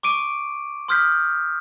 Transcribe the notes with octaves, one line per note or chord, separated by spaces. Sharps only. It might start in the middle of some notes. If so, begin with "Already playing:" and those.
C#6 D6 D7 D#7
C6 D#6 F6 G6 B6